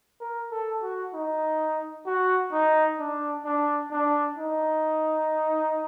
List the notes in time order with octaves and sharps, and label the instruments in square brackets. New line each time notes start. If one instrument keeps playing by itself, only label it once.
[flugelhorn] A#4
A4
F#4
D#4
F#4
D#4
D4
D4
D4
D#4